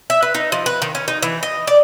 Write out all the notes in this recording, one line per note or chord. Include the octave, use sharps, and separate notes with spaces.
E5
B4
D#4
F3
B4
D#3
C#4
D#4
E3
D#5
D5